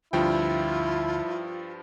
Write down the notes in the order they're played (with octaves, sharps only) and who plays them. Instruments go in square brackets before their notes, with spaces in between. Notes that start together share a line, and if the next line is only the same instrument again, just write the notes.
[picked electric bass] D2 [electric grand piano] G2 F3 G5 [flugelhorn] E4 [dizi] F4